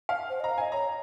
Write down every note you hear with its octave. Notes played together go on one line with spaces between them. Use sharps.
F5
C5
D#5
A#5
F5
D#5 G#5
C#5 A#5